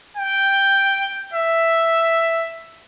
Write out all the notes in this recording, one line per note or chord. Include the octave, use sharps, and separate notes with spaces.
G5
E5